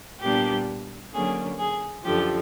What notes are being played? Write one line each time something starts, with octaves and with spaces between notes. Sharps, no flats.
A#2 G3 B3 D4 G4
D3 F#3 A#3 C#4 G#4
G#4
F#2 D3 F3 G4